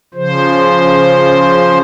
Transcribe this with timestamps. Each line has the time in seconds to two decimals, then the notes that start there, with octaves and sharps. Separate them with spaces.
0.14 C#3 F3 C5